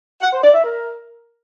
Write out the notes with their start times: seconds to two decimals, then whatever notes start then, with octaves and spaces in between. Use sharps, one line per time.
0.21 F#5
0.32 C5
0.42 D5
0.53 E5
0.64 A#4